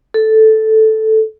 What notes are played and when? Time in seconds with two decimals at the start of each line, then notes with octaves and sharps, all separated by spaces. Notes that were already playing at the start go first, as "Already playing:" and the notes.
0.14 A4